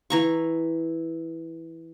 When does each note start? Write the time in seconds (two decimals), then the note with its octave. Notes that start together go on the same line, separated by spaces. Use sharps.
0.10 E3 A#5 C#6